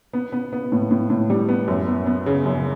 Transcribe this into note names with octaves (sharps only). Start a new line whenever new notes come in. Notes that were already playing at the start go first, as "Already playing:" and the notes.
B3
B3
B3
A2
A2
A2
G3
B3
F#2
B3
B3
C#3
F#2